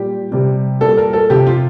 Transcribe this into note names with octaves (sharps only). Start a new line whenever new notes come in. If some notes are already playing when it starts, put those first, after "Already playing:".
Already playing: A#2 G3 G4
C3 G3
A#2 G3 A4
A#4
A4
C3 F3 G4
F4